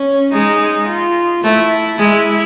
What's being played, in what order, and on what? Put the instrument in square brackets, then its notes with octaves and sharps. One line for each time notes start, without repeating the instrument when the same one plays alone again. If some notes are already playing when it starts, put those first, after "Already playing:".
Already playing: [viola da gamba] C#4
[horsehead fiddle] G#3 [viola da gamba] D#4
[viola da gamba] F4
[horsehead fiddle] A3 [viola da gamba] E4
[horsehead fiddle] G#3 [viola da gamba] E4